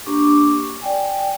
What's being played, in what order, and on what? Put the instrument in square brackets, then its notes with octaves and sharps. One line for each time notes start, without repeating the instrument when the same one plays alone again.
[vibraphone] A#3 D4 G4 C#6 D6
D5 G5 G#5